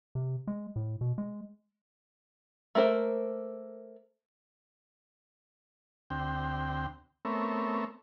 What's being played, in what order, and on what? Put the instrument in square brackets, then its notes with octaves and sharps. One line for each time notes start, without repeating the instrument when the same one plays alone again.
[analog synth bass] C3
G#3
A2
B2
G#3
[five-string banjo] A3 A#3 A#4 C5
[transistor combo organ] D2 C4 G5
A3 B3 C4 A#4 C#5 E5